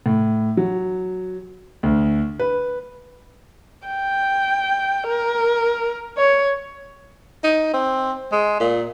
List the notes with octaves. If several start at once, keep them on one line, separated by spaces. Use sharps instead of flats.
A2
F#3
D2
B4
G5
A#4
C#5
D#4
C4
G#3
A#2